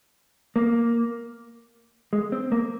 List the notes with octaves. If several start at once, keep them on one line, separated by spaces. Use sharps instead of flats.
A#3
G#3
C4
A#3